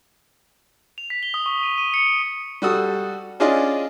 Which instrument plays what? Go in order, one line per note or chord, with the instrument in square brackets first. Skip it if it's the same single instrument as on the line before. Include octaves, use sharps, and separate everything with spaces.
[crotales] F7
B6
G7
D#6
C#6
D#7
D#7
C#7
D7
[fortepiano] G3 F#4 A4 D#6
C#4 D4 F4 G#4 D5 D#5